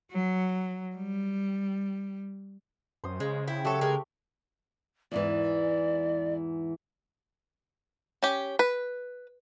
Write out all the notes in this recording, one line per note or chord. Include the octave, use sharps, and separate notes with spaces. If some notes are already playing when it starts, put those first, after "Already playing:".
F#3
G3
F#2 C5 D#6
C#3 G#3
E4 G5
F#3 A3 G4 A4
G#3 A#4
E2 G#2 E3 D5
C#4 G4
B4